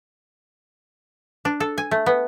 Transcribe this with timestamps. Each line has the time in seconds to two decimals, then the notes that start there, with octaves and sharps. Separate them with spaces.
1.45 D4
1.60 A4
1.78 G#5
1.91 A3
2.06 B3